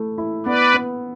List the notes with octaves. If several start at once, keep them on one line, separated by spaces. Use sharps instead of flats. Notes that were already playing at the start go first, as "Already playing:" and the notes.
Already playing: A3 E4
E4
B3 B4 D5
B3